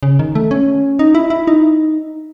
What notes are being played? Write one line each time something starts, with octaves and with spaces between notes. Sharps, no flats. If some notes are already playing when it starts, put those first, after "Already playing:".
C#3
D#3
A3
C#4
D#4
E4
E4
D#4